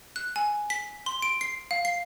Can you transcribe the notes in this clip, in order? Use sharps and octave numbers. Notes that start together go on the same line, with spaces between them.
F#6
G#5
B6
C6
D7
C7
F5
C7